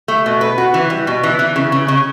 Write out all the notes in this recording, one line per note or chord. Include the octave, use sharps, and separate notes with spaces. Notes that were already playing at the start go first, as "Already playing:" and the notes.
A3
B2
B4
F#4
E3
G3
B2
E3
E3
C#3
C#3
C#3